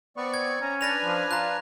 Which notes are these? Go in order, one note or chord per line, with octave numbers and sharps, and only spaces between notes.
B3 C4 D5 C#6
G#6
C#4 A#5
D4 B4 G#5 A6 A#6 F7
F3
F4 A#5 F#6